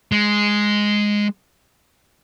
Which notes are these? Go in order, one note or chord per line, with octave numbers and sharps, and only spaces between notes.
G#3